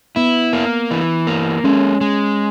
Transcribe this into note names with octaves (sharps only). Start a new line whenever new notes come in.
B3 E4
A#3
E3
A#3
G#3 C#4
G#3